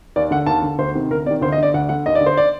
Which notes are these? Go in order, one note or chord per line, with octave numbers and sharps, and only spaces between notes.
D#2 D5
D3 F#5
D#2 A5
D3
D2 C5
C3 D#3
D2 A#4
C3 D#3 D5
D2 C5
D#5
D3 D5
D2 F#5
D3 F#5
D#2 D#5
D5
D3
C5
D5